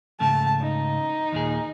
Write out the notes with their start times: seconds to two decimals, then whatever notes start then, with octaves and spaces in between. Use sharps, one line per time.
0.20 G#2 C#3 A3 A5
0.62 D#4
1.32 D#2 A#2 G#4